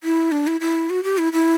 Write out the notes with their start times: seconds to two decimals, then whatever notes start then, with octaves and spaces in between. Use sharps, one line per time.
0.03 E4
0.32 D4
0.47 E4
0.60 E4
0.90 F#4
1.04 G4
1.18 E4
1.33 E4